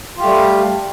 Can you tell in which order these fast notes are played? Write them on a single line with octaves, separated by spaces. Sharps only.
F4 G4 A3 G3